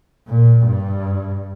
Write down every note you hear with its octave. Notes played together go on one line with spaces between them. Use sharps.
A#2
G2